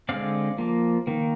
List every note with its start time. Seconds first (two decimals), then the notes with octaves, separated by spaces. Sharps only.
0.09 D3 G#3 C4 D5 F5
0.58 F3 A#3
1.07 D#3 A#3